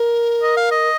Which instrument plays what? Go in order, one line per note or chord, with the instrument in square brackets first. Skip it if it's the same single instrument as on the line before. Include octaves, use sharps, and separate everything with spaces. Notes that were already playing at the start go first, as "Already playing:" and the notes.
Already playing: [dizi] A#4
[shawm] D#5
F5
D#5